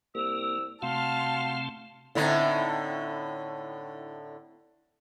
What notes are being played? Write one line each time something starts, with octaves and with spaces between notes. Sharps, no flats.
C2 A#3 E6
C3 A3 C4 F#4 F5 A5 C6 F6
A2 D3 C4 D#4 E4